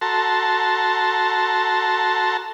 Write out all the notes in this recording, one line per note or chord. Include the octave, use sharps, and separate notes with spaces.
F#4 A4 A5 A#5 C6